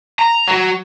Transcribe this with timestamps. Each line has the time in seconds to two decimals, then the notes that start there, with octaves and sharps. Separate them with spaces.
0.19 A#5
0.48 F#3 F#4